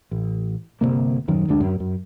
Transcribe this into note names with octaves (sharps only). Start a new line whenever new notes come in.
A1
G1 D#2 C3 A#3
D#1 F#2 D#3
F#1 D2 G#3 D4
F#2
F#2